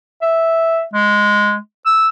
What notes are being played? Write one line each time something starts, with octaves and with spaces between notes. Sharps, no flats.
E5
G#3
E6